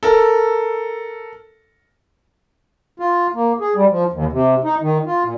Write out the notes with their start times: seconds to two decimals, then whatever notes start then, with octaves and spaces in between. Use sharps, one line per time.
0.03 A4 A#4
3.00 F4
3.34 A#3
3.60 G#4
3.75 G3
3.91 F3
4.12 D#2
4.32 C3
4.64 D#4
4.81 D#3
5.07 F4
5.23 A#2